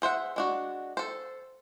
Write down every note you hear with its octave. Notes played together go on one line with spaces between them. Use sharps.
G#4 C5 E5 F#5
G#3 D4 F#4
A4 C5